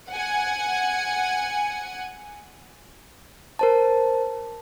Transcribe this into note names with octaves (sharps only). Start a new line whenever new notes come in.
F#5 G#5
A#4 C5 A5